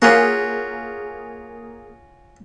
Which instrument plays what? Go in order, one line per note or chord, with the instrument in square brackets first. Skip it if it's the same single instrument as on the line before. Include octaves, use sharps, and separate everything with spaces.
[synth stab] A#3 G#4 [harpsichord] C#4 F4 F#4